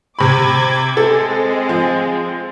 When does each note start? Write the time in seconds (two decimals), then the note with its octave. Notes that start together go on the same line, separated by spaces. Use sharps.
0.19 C3 B5 D6 G#6
0.97 G#3 C4 A4
1.69 F3